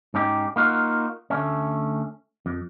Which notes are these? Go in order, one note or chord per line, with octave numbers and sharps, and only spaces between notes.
G#2 C#4 D#4 G4
A#3 D#4 F4 F#4
D2 A3 C#4
F2